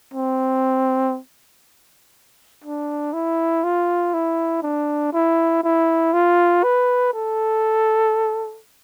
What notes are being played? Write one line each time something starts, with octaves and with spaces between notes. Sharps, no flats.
C4
D4
E4
F4
E4
D4
E4
E4
F4
B4
A4